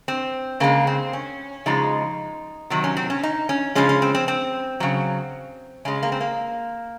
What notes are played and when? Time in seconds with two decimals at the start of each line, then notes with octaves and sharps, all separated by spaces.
0.08 C4
0.60 C#3 G#3 A#3
0.87 C4
1.13 C#4
1.66 C#3 F3 G#3 D#4
2.70 C3 D#3 F#3
2.84 C#4
2.97 C4
3.10 C#4
3.23 D#4
3.49 C#4
3.75 C#3 F3 G#3 C#4
3.89 C#4
4.02 C4
4.15 C4
4.28 C4
4.80 C#3 F#3
5.85 C#3 G#3 C#4
6.03 A#3
6.12 C4
6.20 A#3